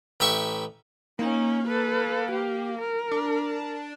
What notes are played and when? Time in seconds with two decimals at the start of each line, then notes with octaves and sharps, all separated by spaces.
0.20 A1 G4 E5 C#6
1.19 A#3 C#4 D#4
1.68 A4 B4
2.31 G4
2.78 A#4
3.11 D4